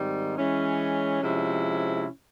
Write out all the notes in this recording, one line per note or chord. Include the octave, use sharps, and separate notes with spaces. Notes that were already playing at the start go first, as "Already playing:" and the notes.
Already playing: G#2 D#3 G3 C4 D#4
E3 G#3 C#4
C3 F3 G#3 C#4 E4